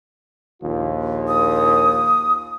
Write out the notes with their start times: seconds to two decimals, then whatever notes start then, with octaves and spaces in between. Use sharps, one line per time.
0.62 A#1 D#2 F4
1.28 D#6